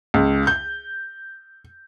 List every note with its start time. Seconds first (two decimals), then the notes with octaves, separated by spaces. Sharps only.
0.14 C#2
0.47 G6